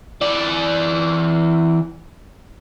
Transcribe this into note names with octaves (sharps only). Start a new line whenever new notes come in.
E3 D5